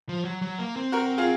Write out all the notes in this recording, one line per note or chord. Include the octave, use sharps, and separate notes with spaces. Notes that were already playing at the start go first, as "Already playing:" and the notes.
F3
F#3
F#3
A#3
C4
F#4 A#4
F4 G#4